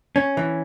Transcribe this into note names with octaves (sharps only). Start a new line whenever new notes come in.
C#4
E3